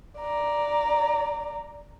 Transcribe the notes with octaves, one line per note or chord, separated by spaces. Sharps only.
D5 A#5